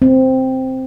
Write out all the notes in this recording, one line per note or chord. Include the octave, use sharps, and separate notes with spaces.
C4